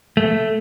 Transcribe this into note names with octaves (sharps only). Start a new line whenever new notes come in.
A3